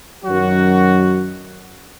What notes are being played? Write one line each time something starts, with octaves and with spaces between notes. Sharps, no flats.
F#2 D#3 F#3 F#4